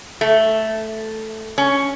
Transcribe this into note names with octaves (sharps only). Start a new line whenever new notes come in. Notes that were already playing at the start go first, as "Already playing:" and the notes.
A3
C#4